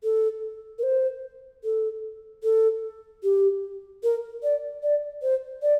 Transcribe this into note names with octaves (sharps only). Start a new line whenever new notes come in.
A4
A#4
C5
A4
A4
G4
A#4
D5
D5
C5
D5